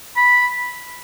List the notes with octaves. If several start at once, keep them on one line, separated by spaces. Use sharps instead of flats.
B5